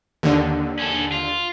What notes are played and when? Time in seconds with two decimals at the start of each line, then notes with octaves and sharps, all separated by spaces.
0.23 D#2 D3
0.79 C#4 A4
1.12 F4